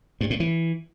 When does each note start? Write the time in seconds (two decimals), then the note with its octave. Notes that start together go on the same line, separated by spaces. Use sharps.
0.21 G2
0.30 A2
0.40 E3